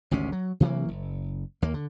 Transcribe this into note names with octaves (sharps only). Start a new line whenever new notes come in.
G#1 D2 C3 C#4
F#3
C3 E3 F#3 A#3
F#1
D#2 A#3
D3